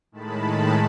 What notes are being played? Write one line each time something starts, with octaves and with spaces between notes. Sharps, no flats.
A2 D#3 G#3 A5 B5